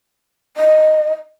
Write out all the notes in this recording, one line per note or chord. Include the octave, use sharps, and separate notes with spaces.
D#5